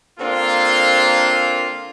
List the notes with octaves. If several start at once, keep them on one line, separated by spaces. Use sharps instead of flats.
D3 A#3 C4 D4 F4